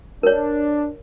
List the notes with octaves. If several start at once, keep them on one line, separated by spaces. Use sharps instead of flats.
D4 A#4 C#5